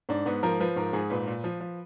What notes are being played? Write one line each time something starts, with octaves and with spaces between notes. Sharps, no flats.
G#2 D4
G#2 B3
F3 A#4
F3 B4
G#2 A#4
G#2 G#4
A#2 B4
A#2
F3
F3